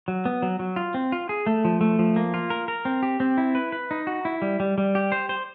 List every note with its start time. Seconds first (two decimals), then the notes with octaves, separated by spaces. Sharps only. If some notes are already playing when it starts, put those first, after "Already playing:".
0.08 F#3
0.25 B3
0.42 F#3
0.59 F#3
0.76 F4
0.94 C4
1.12 F4
1.29 G#4
1.47 A3
1.65 F3
1.81 A3
1.99 F3
2.16 A#3
2.34 F4
2.50 A#4
2.68 A#4
2.85 C4
3.03 G4
3.20 C4
3.38 E4
3.55 B4
3.72 B4
3.91 D#4
4.07 F#4
4.25 E4
4.42 G3
4.60 G3
4.78 G3
4.95 G4
5.12 C5
5.29 C5